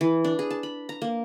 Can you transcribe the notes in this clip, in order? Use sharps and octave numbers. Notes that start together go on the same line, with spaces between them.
E3
D4
G#4
A5
B5
A#5
A#3